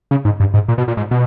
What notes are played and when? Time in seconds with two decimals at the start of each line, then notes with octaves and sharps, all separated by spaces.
0.11 C#3
0.25 G#2
0.40 G2
0.54 G#2
0.68 A#2
0.78 B2
0.88 A#2
0.97 G#2
1.11 B2